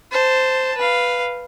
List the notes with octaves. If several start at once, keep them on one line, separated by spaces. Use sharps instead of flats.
C5 A5
B4 F5